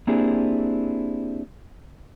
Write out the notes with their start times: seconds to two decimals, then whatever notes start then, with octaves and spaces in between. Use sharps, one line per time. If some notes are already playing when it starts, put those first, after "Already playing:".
0.07 A#3 C4 D4 E4 G4 G#4